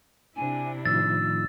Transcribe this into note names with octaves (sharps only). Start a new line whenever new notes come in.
C3 D4 E4 G#5
A2 D#3 F3 E6 A6